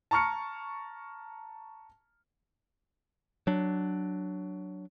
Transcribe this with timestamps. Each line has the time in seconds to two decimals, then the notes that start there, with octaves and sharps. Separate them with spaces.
0.11 A5 A#5 C#6 F6 C#7
3.47 F#3 D4